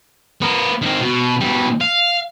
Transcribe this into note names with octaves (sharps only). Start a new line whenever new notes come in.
B3 A#4
D#3 C4
B2
B2 G3
F5